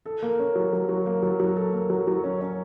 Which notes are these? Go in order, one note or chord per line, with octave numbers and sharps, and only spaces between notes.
A4
A#3
C#4
F#3
F#3
F#3
A#3
F#3
F#3
A4
A#3
F#3
F#3
C#4
C#4